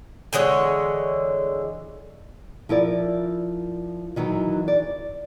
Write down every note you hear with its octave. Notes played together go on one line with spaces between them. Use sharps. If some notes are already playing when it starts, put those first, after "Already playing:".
D3 E3 G#3 C#5
F3 E4 A#4 D5
D#3 E3 F#3 D#4
D5